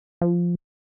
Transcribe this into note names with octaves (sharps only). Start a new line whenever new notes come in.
F3